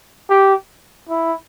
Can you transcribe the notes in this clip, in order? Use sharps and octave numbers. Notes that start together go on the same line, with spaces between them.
G4
E4